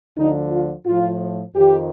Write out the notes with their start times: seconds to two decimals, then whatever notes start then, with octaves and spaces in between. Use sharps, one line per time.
0.17 D2 D3 F3 D#4
0.51 F4
0.86 A2 F3 F4
1.54 F2 D#3 G4